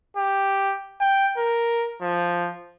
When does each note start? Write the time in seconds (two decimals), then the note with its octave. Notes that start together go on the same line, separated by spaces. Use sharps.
0.17 G4
1.01 G5
1.37 A#4
2.02 F3